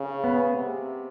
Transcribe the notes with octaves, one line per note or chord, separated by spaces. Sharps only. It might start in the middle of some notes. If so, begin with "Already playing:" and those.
Already playing: C#3
B3
C3